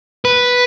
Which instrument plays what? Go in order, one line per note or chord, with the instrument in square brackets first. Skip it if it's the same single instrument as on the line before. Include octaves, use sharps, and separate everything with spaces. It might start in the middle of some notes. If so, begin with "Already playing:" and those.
[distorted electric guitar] B4